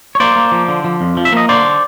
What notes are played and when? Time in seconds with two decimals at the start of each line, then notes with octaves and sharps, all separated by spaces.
0.15 C#5
0.20 A#3 C5 D5
0.36 A#3
0.52 F3
0.68 D3
0.84 F3
1.01 F2
1.17 F3
1.25 E5
1.32 A#3 D#5
1.49 D3 C5 D5